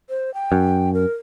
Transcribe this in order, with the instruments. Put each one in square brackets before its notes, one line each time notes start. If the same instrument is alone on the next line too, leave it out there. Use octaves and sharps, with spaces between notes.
[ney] C5
G5
[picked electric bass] F#2
[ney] A#4